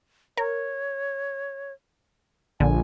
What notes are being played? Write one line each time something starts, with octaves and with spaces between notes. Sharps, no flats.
A#4 C#5
A#1 D3 G#5